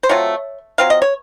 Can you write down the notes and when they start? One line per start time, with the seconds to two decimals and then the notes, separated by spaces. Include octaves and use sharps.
0.03 C5
0.09 F#3 A3 C4 F4 C#5
0.78 F#3 C4 F4 F5
0.90 D#5
1.02 C#5